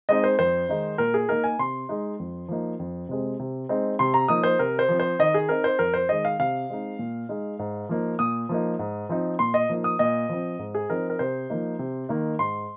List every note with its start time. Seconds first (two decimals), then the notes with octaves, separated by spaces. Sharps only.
0.09 G#3 C4 D#4 D#5
0.24 C5
0.39 F2 C5
0.69 D#3 G#3 D#4
0.98 A#2 A#4
1.14 G#4
1.29 A#3 D#4 A#4
1.44 G#5
1.59 C3 C6
1.89 G#3 D#4
2.19 F2
2.48 F3 A#3 D#4
2.79 F2
3.09 C3 G#3 C4
3.39 C3
3.69 G#3 C4 D#4
3.99 C3 C6
4.14 A#5
4.28 F3 A#3 D#4 D#6
4.43 C5
4.59 C3 A#4
4.79 C5
4.89 F3 C4
5.00 C5
5.19 D#3 D#5
5.34 G#4
5.49 C4 D#4 A#4
5.64 C5
5.79 F2 A#4
5.94 C5
6.09 D#3 G#3 D#5
6.25 F5
6.39 C3 F5
6.70 G#3 C4 D#4
6.99 A#2
7.29 G#3 D#4
7.59 G#2
7.89 F3 A#3 D#4
8.19 A#2 D#6
8.49 F3 A#3 D#4
8.79 G#2
9.09 F3 C4 D#4
9.39 A#2 C6
9.54 D#5
9.69 F3 A#3 D#4
9.84 D#6
9.99 A#2 D#5
10.29 F3 C4
10.59 G#2
10.75 G#4
10.89 F3 C4 D#4 A#4
11.10 A#4
11.19 C3 C5
11.50 F3 A#3 D#4
11.79 C3
12.09 D#3 A#3 D#4
12.39 G#2 C6